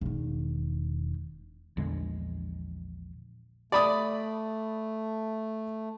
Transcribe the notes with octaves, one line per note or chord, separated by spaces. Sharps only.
E1 D#3
A#1 E2 D3 G#3
A3 D5 B5 D#6